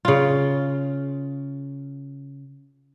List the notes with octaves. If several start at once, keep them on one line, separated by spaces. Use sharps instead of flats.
C#3 F4